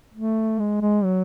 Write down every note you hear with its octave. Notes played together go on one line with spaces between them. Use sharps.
A3
G#3
G#3
F#3